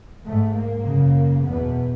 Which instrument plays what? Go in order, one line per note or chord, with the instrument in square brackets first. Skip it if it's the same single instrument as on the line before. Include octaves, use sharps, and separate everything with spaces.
[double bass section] G#2 A3
A#3
F#2 C#3
E2 B2 B3